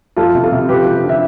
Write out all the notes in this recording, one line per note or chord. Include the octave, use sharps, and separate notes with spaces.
F2 F4 A4
C3
F4 A4
C3
F3 G4 B4
F3
D3
E5